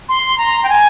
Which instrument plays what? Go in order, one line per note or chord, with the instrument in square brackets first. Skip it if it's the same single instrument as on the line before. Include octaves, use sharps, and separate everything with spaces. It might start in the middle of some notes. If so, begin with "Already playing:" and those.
[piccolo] C6
A#5
G5
G#5